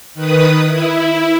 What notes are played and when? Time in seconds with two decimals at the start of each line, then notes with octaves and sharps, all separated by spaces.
0.14 D#3 B4 D#6
0.65 E4